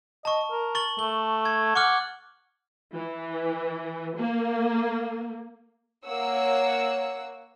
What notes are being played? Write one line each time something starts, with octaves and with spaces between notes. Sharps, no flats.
D#5 A5 C#6
A#4
C#6 A6 F#7
A3 G7
G#6
F#5 C#6 D6 F6
E3
A#3
A#3 C#5 F#5 E6